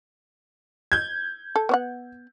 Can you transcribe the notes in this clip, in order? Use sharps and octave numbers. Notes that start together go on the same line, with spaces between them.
G6 G#6
A4
B3 C#5 F#5